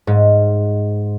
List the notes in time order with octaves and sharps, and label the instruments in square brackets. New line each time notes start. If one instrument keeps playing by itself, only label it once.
[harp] G#2